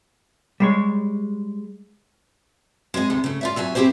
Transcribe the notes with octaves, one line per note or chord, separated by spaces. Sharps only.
G3 G#3 C#5
G#3 C4 G#4 D#5
D2 C3 G#3 D#4
C#3 A3
F4 D5 E5
C3 F#3 E5 G#5
C4 E4 G4 G#4 C5